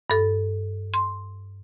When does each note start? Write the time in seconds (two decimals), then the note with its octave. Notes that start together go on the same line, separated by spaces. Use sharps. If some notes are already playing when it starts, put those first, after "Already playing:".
0.10 G2 A4
0.94 C6